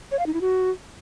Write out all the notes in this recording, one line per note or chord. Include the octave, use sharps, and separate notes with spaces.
C#5
F5
D#4
E4
F#4